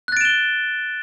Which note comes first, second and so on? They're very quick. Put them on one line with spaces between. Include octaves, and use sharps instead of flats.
F#6 A6 D7 E7 G7